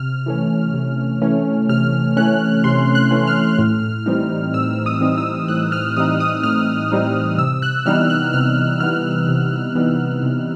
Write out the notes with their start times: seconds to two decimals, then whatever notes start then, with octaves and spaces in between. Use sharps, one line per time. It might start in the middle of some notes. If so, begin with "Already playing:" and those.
Already playing: C3 F6
0.26 E3 A3 C#4
0.74 C3
1.22 E3 A3 C#4
1.69 C3 F6
2.17 E3 A3 C#4 F#6
2.64 C3 C6
2.95 F#6
3.11 E3 A3 C#4
3.27 F6
3.59 A2
4.06 E3 G3 C4 D#4
4.54 A2 E6
4.86 D#6
5.01 E3 G3 C4 D#4
5.18 E6
5.48 A2 F#6
5.72 F6
5.97 E3 G3 C4 D#4 D#6
6.20 D#6
6.44 A2 F6
6.92 E3 G3 C4 D#4
7.38 C3 E6
7.62 F#6
7.86 E3 G3 B3 D#4 F6
8.10 F#6
8.33 C3 F6
8.80 E3 G3 B3 D#4 F6
9.29 C3
9.75 E3 G3 B3 D#4
10.23 C3